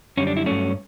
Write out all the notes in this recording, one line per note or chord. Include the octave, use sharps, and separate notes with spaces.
F#2 D3 G3 C#4
D4
E4
G2 F#3 A3 C#4